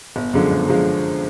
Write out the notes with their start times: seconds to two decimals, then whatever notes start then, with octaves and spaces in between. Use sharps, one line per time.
0.16 G1
0.34 F#2 D3 F3 G#3
0.51 G1
0.68 D3 F3 G#3